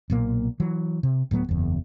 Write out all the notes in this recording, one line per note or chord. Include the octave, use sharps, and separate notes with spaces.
B1 A#2 A#3
E3 F#3
C3
D1 A2 F#3 B3
F#1 E2